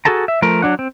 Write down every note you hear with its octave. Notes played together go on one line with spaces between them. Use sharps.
F#4 G#4 A4 A5 A#5
E5
F3 A3 A#4
F#3 D4 F#5
C4